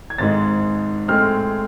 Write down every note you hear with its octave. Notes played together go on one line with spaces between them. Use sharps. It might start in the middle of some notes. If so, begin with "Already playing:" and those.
G#6
G#1 G#2 G#3 A6
A2 G#3 C4 F6